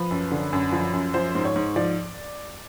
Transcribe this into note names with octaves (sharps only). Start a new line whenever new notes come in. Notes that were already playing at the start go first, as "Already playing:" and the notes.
Already playing: F3 B4
F#2
D3
F#2
F3
F#2
F3 C5
G#2
C#5
G#2
F3 D5